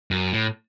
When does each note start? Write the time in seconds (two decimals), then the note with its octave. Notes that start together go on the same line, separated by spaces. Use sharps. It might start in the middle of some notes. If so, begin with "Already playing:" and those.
0.11 F#2
0.33 A2